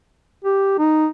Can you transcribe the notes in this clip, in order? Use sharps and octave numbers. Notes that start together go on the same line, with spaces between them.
G4
D#4